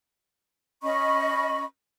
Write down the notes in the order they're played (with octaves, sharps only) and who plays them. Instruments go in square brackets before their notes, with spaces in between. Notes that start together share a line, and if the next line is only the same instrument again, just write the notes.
[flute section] C#4 D#5 B5 C#6